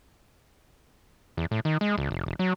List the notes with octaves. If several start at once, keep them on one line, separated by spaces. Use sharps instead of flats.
E2
A2
D#3
G#3
C#2
F1
E1
F#3